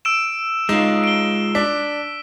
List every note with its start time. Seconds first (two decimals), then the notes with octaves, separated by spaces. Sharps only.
0.05 E6 D7 E7
0.69 G#3 D#4 F4 E7
1.04 D7 G7
1.55 D4 B6